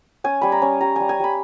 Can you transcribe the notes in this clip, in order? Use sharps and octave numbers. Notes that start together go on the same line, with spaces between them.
C#4 G#5
G3 B5
A#5
C#4
G3 A#5
G3 G#5
G#5
G3 B5